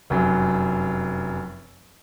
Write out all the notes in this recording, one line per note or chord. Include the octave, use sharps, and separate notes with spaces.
F1 F#2